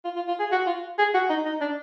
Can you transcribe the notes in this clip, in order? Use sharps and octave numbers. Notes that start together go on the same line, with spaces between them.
F4
F4
F4
G#4
F#4
F4
G#4
F#4
D#4
D#4
D4